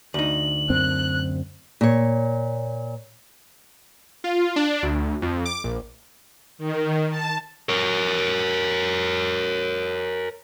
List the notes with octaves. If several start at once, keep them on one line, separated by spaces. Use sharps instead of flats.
D2 D#4 F#7
F#2 C4 F#6
A#2 C#5
F4
D4
D2
F2
D6
A#1
D#3
A5
A#4 C#5